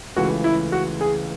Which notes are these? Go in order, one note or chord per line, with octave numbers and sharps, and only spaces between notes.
C#2 C#3 E3 A3 F#4
E4
F#4
G#4